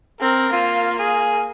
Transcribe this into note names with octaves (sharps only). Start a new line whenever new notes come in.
C4 A#4
A#3 F4
G#4